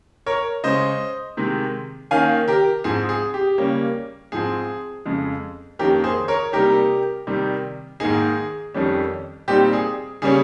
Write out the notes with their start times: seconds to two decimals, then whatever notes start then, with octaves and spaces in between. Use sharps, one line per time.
0.26 A#4 C#5
0.64 C#3 G#3 C#4 C5 D#5
1.37 C3 D#3 G#3
2.11 D#3 A#3 C#4 F5 G#5
2.48 G4 A#4
2.84 G#2 F3 C4 G#4
3.09 G#4
3.34 G4
3.58 C#3 G3 A#3 C#4
4.32 G#2 F3 C4 G#4
5.05 F2 C#3 G#3
5.79 F2 D#3 A#3 C#4 G4 A#4
6.04 G#4 C5
6.28 A#4 C#5
6.53 C3 G3 A#3 D#4 G4 A#4
7.27 C3 D#3 G3
8.00 G#2 D#3 A#3 D#4 G#4
8.74 F2 D#3 G3 C#4
9.48 A#2 G3 C4 D#4 G4
9.73 G#4
10.22 C#3 G3 A#3 C#4 G#4